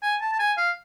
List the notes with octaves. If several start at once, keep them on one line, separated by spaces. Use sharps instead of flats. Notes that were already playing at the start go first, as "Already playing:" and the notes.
G#5
A5
A5
G#5
F5